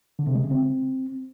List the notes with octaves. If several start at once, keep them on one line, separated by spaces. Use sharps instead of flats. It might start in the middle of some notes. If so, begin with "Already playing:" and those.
D3
C3
G#3
C#3
C4